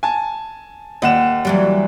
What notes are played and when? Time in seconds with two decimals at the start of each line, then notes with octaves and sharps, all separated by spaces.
0.03 G#5 A5
1.02 D#2 D#5 F#5 E7
1.45 E3 F#3 G3